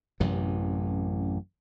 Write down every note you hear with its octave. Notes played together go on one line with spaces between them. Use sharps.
A1 F#2 C3 E3